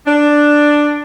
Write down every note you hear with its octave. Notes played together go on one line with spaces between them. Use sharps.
D4